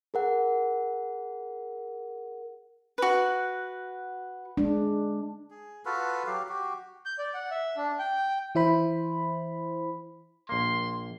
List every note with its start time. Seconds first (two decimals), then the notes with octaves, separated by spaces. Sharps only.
0.14 G#4 A#4 F#5
2.98 F#4 B4
4.57 G#3 D4
5.50 G#4
5.85 F4 F#4 A4 B4
6.27 F#3 G4 F5
6.49 F#4 G4
7.06 G6
7.19 D5
7.34 F#5
7.51 E5
7.77 D4
7.99 G5
8.55 E3 E4 C5 B5
10.49 A#1 A#3 C6